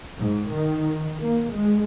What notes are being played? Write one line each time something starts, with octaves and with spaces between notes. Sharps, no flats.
G#2
D#3
A#3
G#3